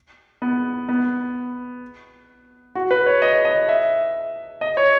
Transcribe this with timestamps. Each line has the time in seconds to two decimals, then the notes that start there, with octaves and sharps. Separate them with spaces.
0.42 B3
0.89 B3
2.75 F#4
2.91 B4
3.06 C#5
3.22 D#5
3.45 D#5
3.69 E5
4.61 D#5
4.77 C#5